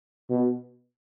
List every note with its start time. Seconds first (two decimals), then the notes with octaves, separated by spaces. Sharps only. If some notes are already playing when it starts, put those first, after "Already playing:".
0.30 B2